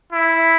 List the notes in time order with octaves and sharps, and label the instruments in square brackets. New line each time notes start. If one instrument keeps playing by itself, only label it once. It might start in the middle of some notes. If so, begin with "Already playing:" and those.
[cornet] E4